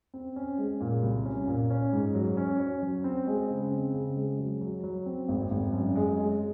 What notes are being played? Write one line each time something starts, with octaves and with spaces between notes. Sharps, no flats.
C4
C#4
G#3
A#2
C2
C#4
A#2
C#4
G#2
F#3
C#4
C#4
F#3
C4
G#3
C#3
C4
C#3
G#3
F#3
F#3
F#3
C4
G#1
G#1
F#2
G#3
G#3